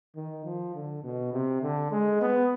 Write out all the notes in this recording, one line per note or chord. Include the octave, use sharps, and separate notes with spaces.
D#3
F3
D3
B2
C3
D3
G#3
B3